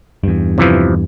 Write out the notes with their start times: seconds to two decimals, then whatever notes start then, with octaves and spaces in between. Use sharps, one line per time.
0.24 E2 G2
0.58 C3 E3 F3